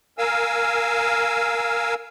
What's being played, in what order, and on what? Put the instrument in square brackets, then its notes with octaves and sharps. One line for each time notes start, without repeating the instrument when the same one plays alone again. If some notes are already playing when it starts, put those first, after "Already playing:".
[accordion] A#4 F5 G#5 E6